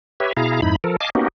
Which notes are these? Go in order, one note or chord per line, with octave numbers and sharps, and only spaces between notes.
G4 B4 C#5 E5
B2 E4 G#4 F5 A#5
F2 G#2 D#4 E4 B5
F3 A4 A#4
D#5 F5 G#5 A5 D6
A#3 B3 C#4 D#4 F#4 G4